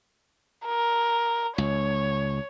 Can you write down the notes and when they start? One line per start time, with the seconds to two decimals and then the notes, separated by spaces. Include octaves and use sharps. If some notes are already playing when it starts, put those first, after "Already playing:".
0.65 A#4
1.58 C#2 C#5